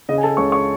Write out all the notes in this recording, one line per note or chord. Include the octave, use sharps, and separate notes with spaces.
C#3 D#5
G#5
A4 A5
C#2 C#5 C#6
C#5 C#6